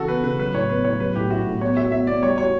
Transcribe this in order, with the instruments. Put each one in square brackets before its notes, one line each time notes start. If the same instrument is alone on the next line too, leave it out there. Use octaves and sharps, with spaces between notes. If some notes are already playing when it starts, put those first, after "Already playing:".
Already playing: [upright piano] C#3 E3 E4 [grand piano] F#4 A4
[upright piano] B3 [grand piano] B4
[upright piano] C#3 [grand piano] B4
[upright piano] F#3 [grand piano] B4
[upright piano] A2 [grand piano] C#5
[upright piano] B3 [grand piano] B4
[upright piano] A2 [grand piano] C#5
[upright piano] F#3 [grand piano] B4
[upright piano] A2 [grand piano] G4
[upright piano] E4 [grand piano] F#4
[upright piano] A2
[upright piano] B3 [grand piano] C#5
[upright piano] F#4 [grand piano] E5
[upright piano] B3 [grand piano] E5
[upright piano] B3 [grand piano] D5
[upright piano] G3 [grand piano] C#5
[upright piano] F#4 [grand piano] C#5